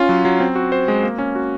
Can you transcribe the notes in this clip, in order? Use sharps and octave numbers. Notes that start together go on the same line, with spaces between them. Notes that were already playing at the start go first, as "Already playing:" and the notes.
Already playing: C#4 F4
F#3
F#3
C4
F#4
C5
G#3
A#3
C#4
F#4